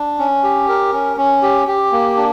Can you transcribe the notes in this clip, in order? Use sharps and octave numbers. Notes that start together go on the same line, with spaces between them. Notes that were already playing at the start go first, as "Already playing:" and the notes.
Already playing: D4
C#4
G4
A#4
C#4
C#4
G4
G4
A#3
D4